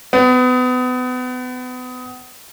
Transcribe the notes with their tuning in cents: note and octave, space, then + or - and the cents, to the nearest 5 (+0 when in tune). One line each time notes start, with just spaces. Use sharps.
B3 +30